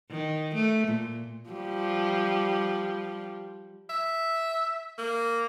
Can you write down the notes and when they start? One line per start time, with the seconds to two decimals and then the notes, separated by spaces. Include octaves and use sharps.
0.10 D#3
0.55 A3
0.87 A#2
1.50 F3 G3
3.90 E5
4.98 A#3